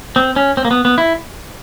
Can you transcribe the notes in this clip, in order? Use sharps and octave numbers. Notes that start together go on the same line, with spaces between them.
C4
C#4
C4
A#3
B3
B3
E4